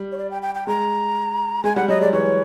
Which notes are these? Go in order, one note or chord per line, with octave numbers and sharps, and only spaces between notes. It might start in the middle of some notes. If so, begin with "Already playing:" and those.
Already playing: G3
C#5
D5
G5
G5
G5
G#3 A#5
G#3 G#5
G3 F#5
F#3 D#5
G#3 D5
E3 C#5